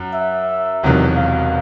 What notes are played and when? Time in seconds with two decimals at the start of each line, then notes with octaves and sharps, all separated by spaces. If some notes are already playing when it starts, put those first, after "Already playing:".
Already playing: F#2 F#3
0.14 E5
0.83 E1 E2 C3 D#3 F#3
1.17 F5